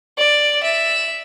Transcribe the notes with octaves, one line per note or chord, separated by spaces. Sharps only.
D5
E5